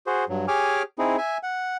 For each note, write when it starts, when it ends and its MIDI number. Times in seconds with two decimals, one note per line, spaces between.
0.07 0.25 66
0.07 0.25 68
0.07 0.25 72
0.29 0.46 43
0.29 0.46 54
0.48 0.82 67
0.48 0.82 68
0.48 0.82 73
0.48 0.82 80
0.48 0.82 86
0.48 0.82 89
0.99 1.17 60
0.99 1.17 63
0.99 1.17 64
0.99 1.17 68
1.18 1.38 76
1.18 1.38 80
1.43 1.77 78